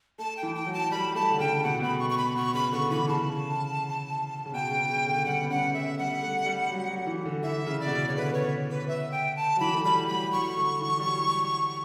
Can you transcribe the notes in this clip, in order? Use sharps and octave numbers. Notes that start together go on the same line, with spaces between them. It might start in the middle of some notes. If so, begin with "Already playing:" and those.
A3 A5
G5
E3
G5
F#3
A5
G3 B5
A3 A5
D3
C#3 G5
B2 F#5
B2 B5
C#6
C#6
B5
B2 C#6
C#3 B5
D3 C#6
E3 B5
C#3 A5
C#3
B2 G5
C#3
C#3
C#3
D3
G3 F#5
B3
C#4 F#5
A3 E5
G3 F#5
A3
G3
F#3
F#3
E3
D3
E3 E5
C#3
D5
B2
C#3
C#5
D3 B4
C#5
B4
E5
G5
A5
F#3
E3 B5
A3
G3 B5
F#3 B5
F#3 C#6
D3
E3
G3
F#3